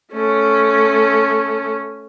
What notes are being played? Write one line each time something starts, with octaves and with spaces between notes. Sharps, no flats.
A3 C#4